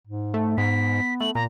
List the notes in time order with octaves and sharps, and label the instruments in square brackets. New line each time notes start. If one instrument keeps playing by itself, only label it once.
[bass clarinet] G#2
[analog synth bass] A3
[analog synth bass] G#2 [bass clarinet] B3 [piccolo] B6
[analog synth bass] A3 [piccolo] F#7
[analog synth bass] A#2 [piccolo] A#5